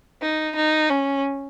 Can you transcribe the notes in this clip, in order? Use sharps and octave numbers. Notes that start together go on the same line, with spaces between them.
D#4
D#4
C#4